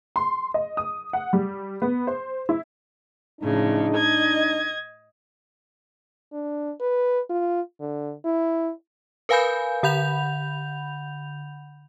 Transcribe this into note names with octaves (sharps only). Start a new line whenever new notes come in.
C6
D#5
D#6
F#5
G3
B3
C5
E4
A2 C#3 F3 D4 D#4
D#5 G#6
D4
B4
F4
D3
E4
A#4 B4 F5 G#5 B5 G6
D3 F#5 B5 G6 F7